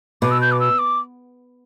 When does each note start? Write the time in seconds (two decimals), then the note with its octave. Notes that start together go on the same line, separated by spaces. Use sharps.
0.22 B2 D6
0.31 E6
0.41 G6
0.52 D6
0.60 E6
0.79 D6